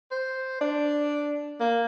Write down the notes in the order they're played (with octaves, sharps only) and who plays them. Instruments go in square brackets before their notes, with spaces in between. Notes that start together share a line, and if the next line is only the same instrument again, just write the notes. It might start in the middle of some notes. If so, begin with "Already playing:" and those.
[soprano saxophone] C5
D4
A#3